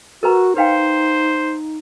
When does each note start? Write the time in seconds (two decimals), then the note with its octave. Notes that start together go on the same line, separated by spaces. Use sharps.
0.23 F#4 A#4 B4 A#5
0.57 D#4 B4 C5 F5 G5